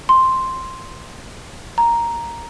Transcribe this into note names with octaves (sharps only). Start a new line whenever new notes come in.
C6
A#5